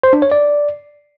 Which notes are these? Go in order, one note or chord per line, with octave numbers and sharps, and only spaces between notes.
C5
D4
C#5
D5